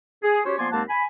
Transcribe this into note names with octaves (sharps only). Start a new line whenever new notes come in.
G#4
C#4 F#4 G4 C5 C#5
F3 A#3 B3 D5 G#5 C6
D#2 G#3 A#3 C4 F#5 A5
G#5 B5